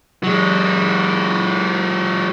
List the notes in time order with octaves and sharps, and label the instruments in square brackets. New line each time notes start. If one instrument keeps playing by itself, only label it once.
[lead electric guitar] F#3 G#3